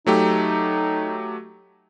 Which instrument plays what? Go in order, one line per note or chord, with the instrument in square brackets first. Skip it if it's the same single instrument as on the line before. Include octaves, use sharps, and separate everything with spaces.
[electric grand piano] F#3 A3 G4 [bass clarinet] D#4